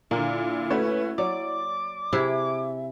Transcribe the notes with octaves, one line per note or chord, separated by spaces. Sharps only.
A#2 D3 A#3 E4
A3 C#4 F#4 B4
F#3 D5 D6
C3 E4 G#4 E5